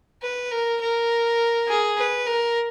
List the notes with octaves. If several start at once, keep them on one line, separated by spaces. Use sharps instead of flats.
B4
A#4
A#4
G#4
B4
A#4